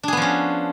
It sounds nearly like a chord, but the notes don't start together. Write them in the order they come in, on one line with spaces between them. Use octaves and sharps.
D4 G#4 B3 F3 C#4